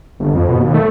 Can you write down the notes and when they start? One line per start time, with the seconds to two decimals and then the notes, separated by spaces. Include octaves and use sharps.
0.20 G1
0.34 F2
0.49 B2
0.60 D#2
0.74 A3